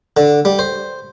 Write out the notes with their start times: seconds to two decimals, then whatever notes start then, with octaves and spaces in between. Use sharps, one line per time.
0.17 D3
0.45 G3
0.59 C5